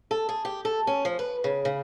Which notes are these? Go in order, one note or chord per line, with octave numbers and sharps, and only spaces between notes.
A4
G#4
G4
A4
C#4
F3
B4
C#3
C#3